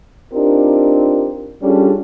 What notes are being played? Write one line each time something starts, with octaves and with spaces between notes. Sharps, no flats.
C4 D4 D#4 F4 G4 A#4
G3 C#4 D4 F4 G#4 A4